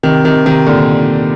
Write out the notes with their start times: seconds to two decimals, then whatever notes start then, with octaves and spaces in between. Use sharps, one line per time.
0.03 C3 D#3
0.24 C3 D#3
0.46 C3 D#3
0.66 A#2 D3